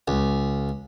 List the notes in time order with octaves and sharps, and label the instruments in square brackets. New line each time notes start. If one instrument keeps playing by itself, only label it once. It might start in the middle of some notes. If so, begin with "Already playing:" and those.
[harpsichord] C#2